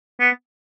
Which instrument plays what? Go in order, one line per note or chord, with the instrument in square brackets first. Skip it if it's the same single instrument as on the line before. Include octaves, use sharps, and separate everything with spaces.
[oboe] B3